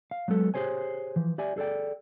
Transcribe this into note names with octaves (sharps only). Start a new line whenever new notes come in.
F5
F#3 G#3 B3 A4
G4 G#4 C5 C#5 G#5
E3 F3
G4 D5 E5 G#5
G#4 A4 C5 D5 G5